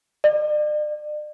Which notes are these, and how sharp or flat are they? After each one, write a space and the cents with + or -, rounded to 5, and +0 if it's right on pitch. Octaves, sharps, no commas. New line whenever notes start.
D5 +40